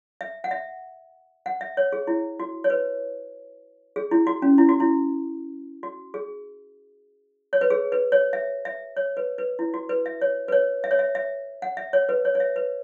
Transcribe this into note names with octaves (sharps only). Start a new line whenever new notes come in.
E5
F#5
E5
F#5
E5
C#5
G#4
E4
F#4
C#5
B4
G#4
E4
F#4
C#4
E4
F#4
E4
F#4
G#4
C#5
B4
G#4
B4
C#5
E5
E5
C#5
B4
B4
E4
F#4
B4
E5
C#5
B4
C#5
E5
C#5
E5
E5
F#5
E5
C#5
B4
C#5
C#5
E5
B4